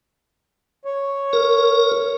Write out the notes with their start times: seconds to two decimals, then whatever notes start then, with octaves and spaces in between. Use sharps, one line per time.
0.85 C#5
1.33 A#4